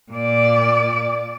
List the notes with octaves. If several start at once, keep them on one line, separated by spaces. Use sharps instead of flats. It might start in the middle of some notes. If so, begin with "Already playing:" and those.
A#2 D5